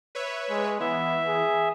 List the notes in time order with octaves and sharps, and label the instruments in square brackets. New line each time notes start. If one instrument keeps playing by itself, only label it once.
[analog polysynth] B4 C#5 E5
[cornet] G#3
[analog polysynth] E3 [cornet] B3 [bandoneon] E5
[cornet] G#4